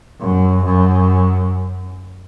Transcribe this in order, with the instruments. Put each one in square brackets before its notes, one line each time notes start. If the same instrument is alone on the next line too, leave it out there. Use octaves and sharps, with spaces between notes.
[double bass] F#2
F#2